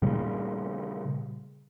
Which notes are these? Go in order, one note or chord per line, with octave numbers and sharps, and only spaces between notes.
A#2 C#3 G3